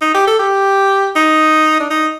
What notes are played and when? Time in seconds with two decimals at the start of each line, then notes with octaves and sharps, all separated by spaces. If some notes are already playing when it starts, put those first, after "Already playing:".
0.01 D#4
0.14 G4
0.27 A4
0.39 G4
1.16 D#4
1.80 D4
1.90 D#4